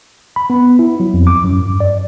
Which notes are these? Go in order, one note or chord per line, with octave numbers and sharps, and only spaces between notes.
B5
B3
E4
F#3
F2
D6
F#2
G2
D5